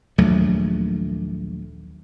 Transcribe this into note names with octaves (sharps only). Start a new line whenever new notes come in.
A#1 D#2 F#3 A3